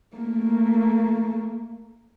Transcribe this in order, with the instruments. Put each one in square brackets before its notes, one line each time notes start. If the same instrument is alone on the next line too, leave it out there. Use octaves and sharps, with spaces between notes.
[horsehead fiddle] A3 A#3